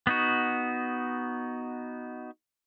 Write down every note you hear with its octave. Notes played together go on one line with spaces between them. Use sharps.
B3 D#4 F#4